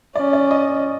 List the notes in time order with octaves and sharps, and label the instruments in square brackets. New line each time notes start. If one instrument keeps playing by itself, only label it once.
[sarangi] C#4 [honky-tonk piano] D5
[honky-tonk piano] D5
D#5